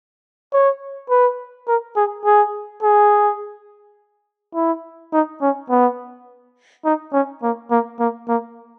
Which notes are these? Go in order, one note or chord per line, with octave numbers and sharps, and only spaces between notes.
C#5
B4
A#4
G#4
G#4
G#4
E4
D#4
C#4
B3
D#4
C#4
A#3
A#3
A#3
A#3